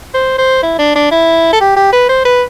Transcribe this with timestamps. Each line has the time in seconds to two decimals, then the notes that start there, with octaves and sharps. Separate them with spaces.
0.14 C5
0.38 C5
0.63 E4
0.79 D4
0.95 D4
1.11 E4
1.53 A4
1.61 G4
1.76 G4
1.92 B4
2.09 C5
2.25 B4